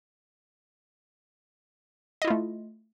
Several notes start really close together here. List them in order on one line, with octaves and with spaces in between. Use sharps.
D#5 E4 F4 A3